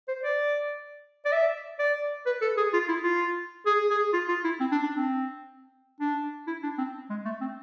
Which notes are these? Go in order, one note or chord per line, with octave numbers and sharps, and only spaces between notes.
C5
D5
D5
E5
D5
B4
A4
G#4
F4
E4
F4
G#4
G#4
F4
F4
E4
C4
D4
D4
C4
D4
E4
D4
C4
G#3
A3
C4